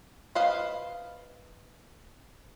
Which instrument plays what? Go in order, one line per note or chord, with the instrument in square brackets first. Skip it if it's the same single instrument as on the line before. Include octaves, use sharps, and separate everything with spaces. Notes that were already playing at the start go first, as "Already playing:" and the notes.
[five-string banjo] B4 C5 D#5 F5